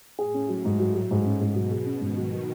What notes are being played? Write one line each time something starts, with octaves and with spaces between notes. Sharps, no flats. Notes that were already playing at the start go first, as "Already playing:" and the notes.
A2 G#4
C#4
F#3
G#2
F#3
F#3
G#2
C#4
G#2 B2
F#3
G#4
C#4
G#2 D#3
F#3
F#3